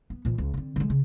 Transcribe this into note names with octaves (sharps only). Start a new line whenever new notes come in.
B3
A#2 E3
C#2
D3 C4
D3 G#3
C#3